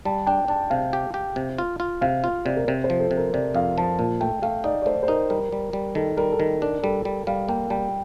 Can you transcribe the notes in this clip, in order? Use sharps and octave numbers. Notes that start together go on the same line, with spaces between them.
G3 A5
D4 G5
D4 A5
C3 F5
G4
G4
C3
F4
F4
C3 F5
F4
C3 D5
A#4
C3 C5
C5
F3
A4
C3
A#4
C3 D5
F2 F5
F3 A5
A#2 A5
A3 G5
A3 F5
D#4 D5
D5
A3 C5
C5
D#4 A#4
G3 A#4
G3
G3
D#3 A4
G3 A#4
A4
D#3 A#4
D4 A#4
G3 A4
G3
G3 F5
A#3 G5
G3 G5